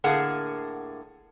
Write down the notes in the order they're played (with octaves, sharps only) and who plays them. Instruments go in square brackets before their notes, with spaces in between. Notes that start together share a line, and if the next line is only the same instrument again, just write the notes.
[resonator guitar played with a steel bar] A2 D3 A#3 G#4 A#4 F#5